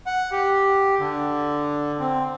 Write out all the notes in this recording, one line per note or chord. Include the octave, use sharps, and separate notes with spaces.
F#5
G4
D3
C4